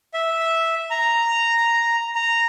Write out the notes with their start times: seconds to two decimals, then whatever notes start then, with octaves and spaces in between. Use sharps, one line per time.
0.14 E5
0.91 A#5
2.15 A#5